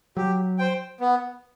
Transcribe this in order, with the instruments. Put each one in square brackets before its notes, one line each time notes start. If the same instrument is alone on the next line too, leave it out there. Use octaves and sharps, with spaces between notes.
[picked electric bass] F#3 [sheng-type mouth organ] G4
[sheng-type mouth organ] C5 G5
B3